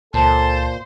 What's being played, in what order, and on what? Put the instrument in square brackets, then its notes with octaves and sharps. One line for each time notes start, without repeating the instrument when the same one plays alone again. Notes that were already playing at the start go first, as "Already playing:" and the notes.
[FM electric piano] C#2 [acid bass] A#2 [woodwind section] A4 A5 [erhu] C5